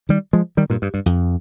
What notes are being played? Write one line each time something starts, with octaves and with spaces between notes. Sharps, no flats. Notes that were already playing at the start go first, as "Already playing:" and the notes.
D#3 G3
F3 G#3
D#3 G3
G2 A#2
G2
G2
F2